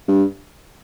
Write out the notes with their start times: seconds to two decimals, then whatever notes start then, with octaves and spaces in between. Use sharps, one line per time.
0.08 G2